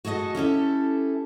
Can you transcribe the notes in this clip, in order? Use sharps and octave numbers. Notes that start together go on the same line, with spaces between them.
F#4 G#4 A4 D#5 F#5
C#4 E4 G4 A4